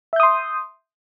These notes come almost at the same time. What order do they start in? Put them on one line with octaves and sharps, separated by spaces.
E5 G6 D#6 C6